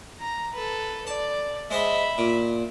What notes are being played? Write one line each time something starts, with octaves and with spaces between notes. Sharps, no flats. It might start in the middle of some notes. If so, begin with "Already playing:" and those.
A#5
A4 B4
D5 A5
G#3 C5 D#5 E5 B5
A#2